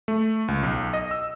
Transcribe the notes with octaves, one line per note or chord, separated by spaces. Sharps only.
A3
C#2
B1
D#5
E6